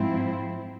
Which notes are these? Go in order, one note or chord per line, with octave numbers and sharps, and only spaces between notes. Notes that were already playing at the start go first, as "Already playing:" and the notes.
Already playing: G#2 F3 C4 E4